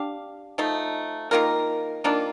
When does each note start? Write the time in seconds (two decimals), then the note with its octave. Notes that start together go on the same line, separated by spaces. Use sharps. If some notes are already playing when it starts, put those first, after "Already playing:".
Already playing: D4 G4 F5
0.58 F3 A3 D#4
1.31 D#3 A#3 F4 A#4
2.04 D#3 A#3 D4 F4